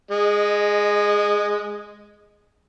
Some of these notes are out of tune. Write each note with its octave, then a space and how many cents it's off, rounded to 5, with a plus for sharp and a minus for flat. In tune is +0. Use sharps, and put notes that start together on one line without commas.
G#3 +0 D#5 -25